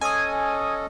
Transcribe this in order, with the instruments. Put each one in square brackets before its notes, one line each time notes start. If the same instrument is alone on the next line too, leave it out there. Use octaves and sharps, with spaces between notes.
[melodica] C#4 A4 D#5 [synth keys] G#5 D#6